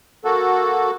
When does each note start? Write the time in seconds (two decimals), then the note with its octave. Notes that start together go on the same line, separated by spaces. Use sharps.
0.24 A#3 F#4 A4